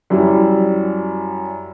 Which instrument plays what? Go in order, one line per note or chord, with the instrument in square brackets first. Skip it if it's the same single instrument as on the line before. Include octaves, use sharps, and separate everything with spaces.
[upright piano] F#2 G3 E4